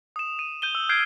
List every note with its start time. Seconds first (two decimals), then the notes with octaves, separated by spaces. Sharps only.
0.16 D#6 E7
0.39 D#7
0.62 G6 D#7 G7
0.75 E6
0.89 F6 G6 G#6 C7 D7